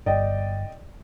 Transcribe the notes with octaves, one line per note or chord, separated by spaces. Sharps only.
G1 D5 D#5 G5